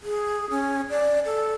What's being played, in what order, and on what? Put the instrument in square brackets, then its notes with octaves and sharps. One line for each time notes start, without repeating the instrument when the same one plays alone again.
[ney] G#4
C#4
D5
A4